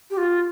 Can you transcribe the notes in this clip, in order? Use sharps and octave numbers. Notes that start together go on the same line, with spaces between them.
G4
F4